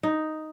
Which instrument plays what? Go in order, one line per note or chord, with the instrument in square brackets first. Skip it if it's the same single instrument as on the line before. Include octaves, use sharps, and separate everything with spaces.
[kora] D#4